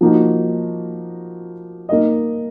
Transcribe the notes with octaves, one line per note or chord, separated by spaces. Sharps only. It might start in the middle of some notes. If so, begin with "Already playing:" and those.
F3 A#3 D#4 F#4
A#3 D#4 A#4 D#5